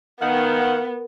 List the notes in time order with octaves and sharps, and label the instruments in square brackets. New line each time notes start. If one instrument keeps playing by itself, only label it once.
[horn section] D#3 [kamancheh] B3 [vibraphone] A#4 [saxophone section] F5 F#5